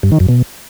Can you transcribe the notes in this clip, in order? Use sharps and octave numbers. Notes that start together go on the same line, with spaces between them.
G2
D#3
F#2
B2